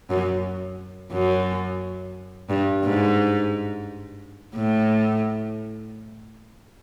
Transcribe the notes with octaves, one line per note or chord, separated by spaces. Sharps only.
F#2
F#2
G2
G#2
A2